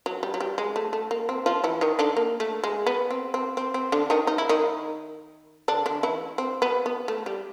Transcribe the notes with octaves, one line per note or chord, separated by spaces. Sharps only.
F#3
G3
F#3
G3
G#3
A3
A3
A#3
C4
F3 F4
E3 E4
D#3 D#4
D3 D4
A#3
A3
G#3
B3
C4
C4
C4
C4
D3 D4
D#3 D#4
D#4
E4
D#3 D#4
D3 D4
D3 D4
E3 E4
C4
B3
B3
A3
G3